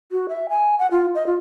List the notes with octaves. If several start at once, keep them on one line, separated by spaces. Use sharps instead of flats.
F#4
E5
G#5
F#5
F4
D#5
F4